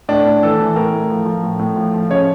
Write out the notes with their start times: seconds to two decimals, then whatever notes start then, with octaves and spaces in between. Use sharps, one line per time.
0.09 A2 D4
0.25 A2
0.43 E3 A4
0.58 E3
0.76 A2 A#4
0.93 A2
1.10 F3
1.26 F3
1.43 A2
1.59 A2
1.76 F3
1.94 F3
2.09 C#3 C#5